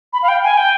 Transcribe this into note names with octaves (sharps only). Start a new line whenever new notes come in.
B5
F5
G5
G#5
G5